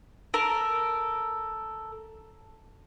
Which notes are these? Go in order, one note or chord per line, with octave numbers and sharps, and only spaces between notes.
A4 A#4